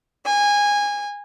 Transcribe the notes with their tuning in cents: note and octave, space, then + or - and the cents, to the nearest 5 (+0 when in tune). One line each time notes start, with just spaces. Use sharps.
G#5 -20